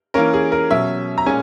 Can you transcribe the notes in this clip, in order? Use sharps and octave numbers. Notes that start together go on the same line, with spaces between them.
E3 A#3 C#4 A#4
G#4
A#4
B2 F#3 C#4 E5
A#5
A#2 G#3 C#4 G#5